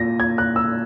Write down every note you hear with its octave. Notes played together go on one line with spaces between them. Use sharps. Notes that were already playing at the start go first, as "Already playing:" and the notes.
Already playing: A#2 A#6
G#6
F#6
E6